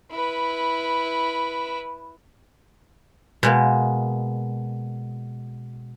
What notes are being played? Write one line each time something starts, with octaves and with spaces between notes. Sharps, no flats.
E4 B4
B2 G#3 A#3